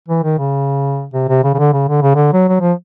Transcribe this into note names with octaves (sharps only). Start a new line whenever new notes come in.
E3
D#3
C#3
C3
C3
C#3
C#3
D3
C#3
D3
C#3
D3
F#3
F#3
F3